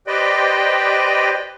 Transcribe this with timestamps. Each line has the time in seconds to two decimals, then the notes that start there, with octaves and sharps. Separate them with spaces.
0.07 G4 B4 C5 D5 D#5 G5